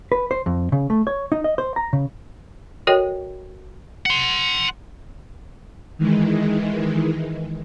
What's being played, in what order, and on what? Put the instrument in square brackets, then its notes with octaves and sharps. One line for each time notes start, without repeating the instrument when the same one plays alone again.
[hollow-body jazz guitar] B4
C5
F2
C#3
A3
C#5
D#4
D#5
C5
A#5
C#3
[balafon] F#4 A4 A#4 C#5 D#5 G5
[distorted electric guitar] F#5 C6
[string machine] D#3 E3 G#3